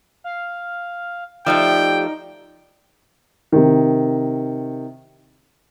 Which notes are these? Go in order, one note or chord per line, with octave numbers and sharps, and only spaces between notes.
F5
F3 A3 D#4 G4 D5 G5
C3 D#3